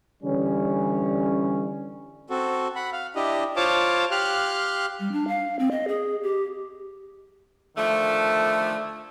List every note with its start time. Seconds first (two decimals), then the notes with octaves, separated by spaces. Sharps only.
0.23 D3 E3 G3 C#4
2.30 C4 F#4 A4
2.75 F#5 B5
2.92 F5
3.16 D4 E4 G4 D#5
3.56 F4 C5 C#5 F5 A5 D6
4.11 G4 F5 C6 F6 F#6
5.00 G3
5.12 D4
5.28 F5
5.59 C4
5.71 D#5
5.88 G#4
6.23 G4
7.76 D3 D#3 F3 A3